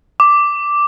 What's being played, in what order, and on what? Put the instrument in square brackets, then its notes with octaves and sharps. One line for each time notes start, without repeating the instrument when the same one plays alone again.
[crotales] D6